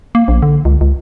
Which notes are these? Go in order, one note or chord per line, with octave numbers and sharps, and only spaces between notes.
A#3
A#1
D3
C#2
C#2